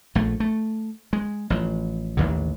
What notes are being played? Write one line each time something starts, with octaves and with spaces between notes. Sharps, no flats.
A#1 A3
A3
G#3
A1 F3
A1 D#2 D3